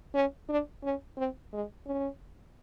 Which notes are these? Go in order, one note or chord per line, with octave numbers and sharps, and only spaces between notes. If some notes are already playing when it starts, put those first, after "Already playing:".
C#4
D4
C#4
C4
G#3
C#4